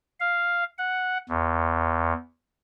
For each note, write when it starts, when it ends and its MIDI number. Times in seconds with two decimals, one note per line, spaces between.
0.20 0.64 77
0.78 1.18 78
1.29 2.13 40